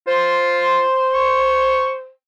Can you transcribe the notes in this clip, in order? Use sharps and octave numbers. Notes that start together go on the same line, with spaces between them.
F4 C5 C6
C#6